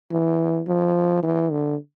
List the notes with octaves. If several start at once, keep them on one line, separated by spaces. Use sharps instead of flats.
E3
F3
E3
D3